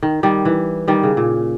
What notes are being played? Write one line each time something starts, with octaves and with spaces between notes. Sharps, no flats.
D#3
D#3 G3
E3
D#3 G3
C#3
A#2